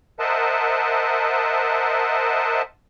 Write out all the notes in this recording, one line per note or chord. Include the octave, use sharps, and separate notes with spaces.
A#4 C5 D#5 E5 F#5 A5